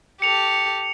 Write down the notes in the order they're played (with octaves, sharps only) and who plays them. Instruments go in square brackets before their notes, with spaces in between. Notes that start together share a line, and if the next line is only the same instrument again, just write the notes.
[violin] G4 A4 [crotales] C#7 F7